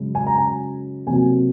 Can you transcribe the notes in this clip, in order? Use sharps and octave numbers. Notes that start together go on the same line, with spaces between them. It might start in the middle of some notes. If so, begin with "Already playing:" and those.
Already playing: F#2 C#3 G#3
G#5
A#5
G#5
C3 F#3 A#3 G#5